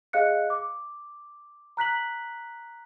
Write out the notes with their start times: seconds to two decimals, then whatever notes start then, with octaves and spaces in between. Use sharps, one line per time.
0.13 G#4 D#5 F5 F#6 C#7
0.50 D6
1.77 A#5 F#6 B6 F#7